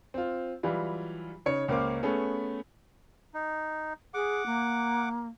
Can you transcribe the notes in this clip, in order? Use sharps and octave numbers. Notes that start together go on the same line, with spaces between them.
C4 F4
E3 F#3 G3 E4 F4
C#3 D#4 C#5 C#7
C#2 A#3 C#4 C5 F5 D6
A3 B3 C#4 G#4
D#4
G#4 F#5 D6
A#3